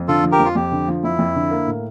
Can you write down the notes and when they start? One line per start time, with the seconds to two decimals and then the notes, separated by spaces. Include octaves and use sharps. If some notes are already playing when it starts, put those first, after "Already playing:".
Already playing: F2
0.08 D3 F4 A4
0.24 F3
0.32 G4 A#4
0.39 F2
0.45 F4
0.55 F2 G4
0.72 D3
0.88 F3
1.04 F2 E4
1.19 F2
1.35 D3
1.51 A#3
1.67 A2